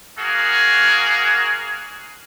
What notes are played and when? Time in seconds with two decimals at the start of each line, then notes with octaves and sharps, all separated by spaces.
0.18 A#3 F#4 G#4